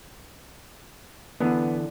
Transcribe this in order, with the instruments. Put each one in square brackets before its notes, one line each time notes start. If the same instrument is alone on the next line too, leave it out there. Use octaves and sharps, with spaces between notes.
[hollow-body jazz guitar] D3 E3 D4 [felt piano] B3